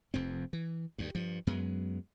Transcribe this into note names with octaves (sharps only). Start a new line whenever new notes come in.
F1 F2 C4
E3
D2 G2
G2 F3
F#2 F#3 G#3 B3